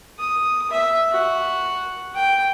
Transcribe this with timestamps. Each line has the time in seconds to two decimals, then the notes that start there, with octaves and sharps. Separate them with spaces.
0.19 D#6
0.71 E5
1.11 F#4
2.15 G5